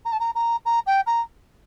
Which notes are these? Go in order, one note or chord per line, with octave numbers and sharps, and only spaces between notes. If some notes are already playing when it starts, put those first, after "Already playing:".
A#5
A5
A#5
A#5
A#5
G5
A#5